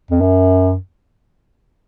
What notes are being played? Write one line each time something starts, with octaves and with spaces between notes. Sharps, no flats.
F2
F#2